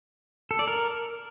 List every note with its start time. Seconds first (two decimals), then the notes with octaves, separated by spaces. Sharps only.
0.51 A4
0.59 D5
0.67 A#4